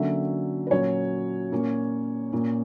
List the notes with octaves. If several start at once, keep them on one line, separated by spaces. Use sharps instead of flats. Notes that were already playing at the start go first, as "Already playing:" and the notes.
Already playing: D3 F#3 A#3 C#4 E5
B4
A#2 F#3 C#4 C#5
A#2 A#3 C#4
A#2 A#3 C#4